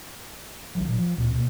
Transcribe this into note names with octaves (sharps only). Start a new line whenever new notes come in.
B1 D#3 F#3
F1 A#2 F#3 D4
F3
D2 A#2 C4
B2 A#3